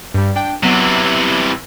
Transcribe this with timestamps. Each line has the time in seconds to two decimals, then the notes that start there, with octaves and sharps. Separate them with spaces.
0.14 G2 G3
0.36 D4 G5
0.63 C3 E3 F#3 B3